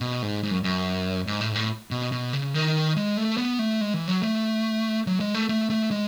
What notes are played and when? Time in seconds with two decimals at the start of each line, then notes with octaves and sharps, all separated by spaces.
0.01 B2
0.23 G#2
0.43 G#2
0.51 F#2
0.64 F#2
1.27 G#2
1.41 A2
1.52 G#2
1.55 A2
1.91 B2
2.12 B2
2.33 C#3
2.54 D#3
2.96 G#3
3.18 A3
3.38 B3
3.59 A3
3.81 G#3
3.94 E3
4.08 F#3
4.23 A3
5.07 F#3
5.20 G#3
5.34 A3
5.49 A3
5.70 A3
5.91 G#3